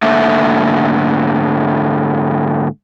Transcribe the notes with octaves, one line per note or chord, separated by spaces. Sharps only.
G#2 D3 A3 A#3 E5